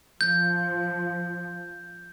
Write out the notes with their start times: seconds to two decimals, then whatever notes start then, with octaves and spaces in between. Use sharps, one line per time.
0.21 F3 G6